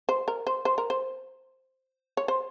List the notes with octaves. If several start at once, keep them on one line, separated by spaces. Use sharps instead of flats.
C5
A#4
C5
C5
A#4
C5
C#5
C5